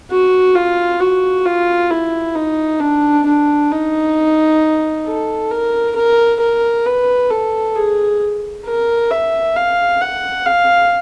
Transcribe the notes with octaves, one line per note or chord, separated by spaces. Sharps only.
F#4
F4
F#4
F4
E4
D#4
D4
D4
D#4
A4
A#4
A#4
A#4
B4
A4
G#4
A#4
E5
F5
F#5
F5